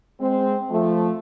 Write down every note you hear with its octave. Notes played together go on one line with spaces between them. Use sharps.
G#3 C4
F3 A3